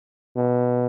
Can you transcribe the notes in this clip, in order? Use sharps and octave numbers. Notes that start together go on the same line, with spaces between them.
B2